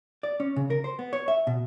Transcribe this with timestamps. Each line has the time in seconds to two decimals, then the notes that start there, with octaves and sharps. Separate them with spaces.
0.23 D5
0.40 C#4
0.56 C#3
0.70 A#4
0.84 C5
0.99 B3
1.13 C#5
1.28 E5
1.47 B2